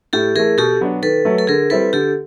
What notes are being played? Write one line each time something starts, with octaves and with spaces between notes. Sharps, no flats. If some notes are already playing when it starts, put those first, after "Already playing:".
A2 G4 A4
E3 A3 G#4 A#4
B2 G4 A4
F#3 B3 D4
D#3 A4 B4
F#3 A3
A4
D3 G#4 A#4
G3 C4 E4 A4 B4
D3 G4 A4